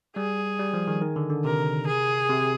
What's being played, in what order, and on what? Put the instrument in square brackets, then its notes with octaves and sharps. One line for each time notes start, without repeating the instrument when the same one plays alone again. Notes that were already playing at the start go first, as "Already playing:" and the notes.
[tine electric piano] G3 [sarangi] G#4
[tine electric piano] G3
F3
D#3
D#3
D3
D3
[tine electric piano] C3 [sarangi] A#4
[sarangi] G#4
[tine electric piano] C3